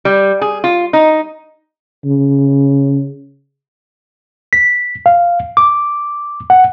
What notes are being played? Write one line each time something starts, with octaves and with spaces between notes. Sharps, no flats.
G3
G#4
F4
D#4
C#3
B6
F5
D6
F#5